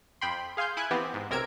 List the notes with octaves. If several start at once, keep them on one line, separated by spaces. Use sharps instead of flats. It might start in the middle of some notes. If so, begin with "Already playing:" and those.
F2 G5 B5 C6
G#4 F5 G#5 C6 G6
E4 G#5 F#6 G#6
E3 B3 C4 G4
G#2
B1 C3 A#4 E6 G#6 D7